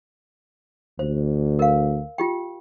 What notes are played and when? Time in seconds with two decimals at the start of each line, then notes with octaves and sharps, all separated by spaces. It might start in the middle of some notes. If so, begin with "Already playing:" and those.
0.99 D2 C5
1.59 A#4 F5
2.18 F4 G4 G5